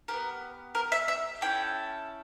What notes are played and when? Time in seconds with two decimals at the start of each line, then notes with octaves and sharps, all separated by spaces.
0.08 D4 G4 A#4
0.13 B3
0.75 A#4
0.92 E5
1.08 E5
1.41 C#4 E4 A4 G5